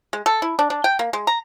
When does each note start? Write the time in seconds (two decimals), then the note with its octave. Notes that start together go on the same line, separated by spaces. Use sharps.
0.13 G#3
0.26 A4
0.42 E4
0.59 D4
0.70 D4
0.84 G5
0.99 A#3
1.13 G#3
1.27 A#5